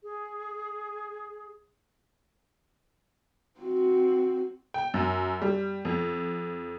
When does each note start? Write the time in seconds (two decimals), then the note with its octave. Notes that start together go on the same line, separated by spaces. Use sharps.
0.03 G#4
3.60 C4 F#4
4.74 G5
4.94 F#2
5.42 G3
5.85 F2